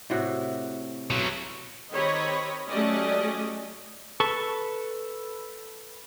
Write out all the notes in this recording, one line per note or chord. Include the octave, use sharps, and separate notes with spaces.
A2 C3 F#4
B2 F#3
D#3 C4 G4 C#5 D#5 B5
F#3 A3 C#4 G4 D5 D#5
A4 B4 A5 C#6